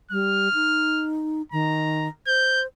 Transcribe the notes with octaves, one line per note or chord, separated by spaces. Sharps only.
G3 F6
D#4
D#3 A#5
C5 G6